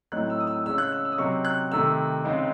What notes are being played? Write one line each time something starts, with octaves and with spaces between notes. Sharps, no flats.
A2 F#3 C4 D#4 F#6
E6
D#6
E6
C#3 G#3 C#4 E6
F#6
E6
E6
D#6
C3 F#3 C4 D#4 C#6
F#6
C3 D#3 A3 C4 E6
C#3 G#3 C4 D#4